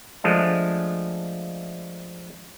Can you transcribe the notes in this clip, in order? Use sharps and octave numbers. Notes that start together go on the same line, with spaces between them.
F3 G#3 A3 D4